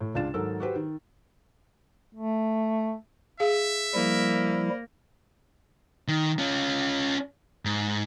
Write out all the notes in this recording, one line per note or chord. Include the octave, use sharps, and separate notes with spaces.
A2
C#2 D4 F4 G#4 A6 E7
G#2 D#3 F#3 A4 A#4 E6
F#4 G4 B4 C5
D#3
A3
G#4 E5 F5
F3 G3 A#3 E4
D#3
C#4 F4
G#2